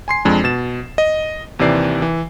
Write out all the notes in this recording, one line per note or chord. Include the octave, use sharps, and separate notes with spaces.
G#5 C6 C7
F2 G#3 D4
B2 A6 E7
D#5
D#2 C3 E3 D5 C7
E3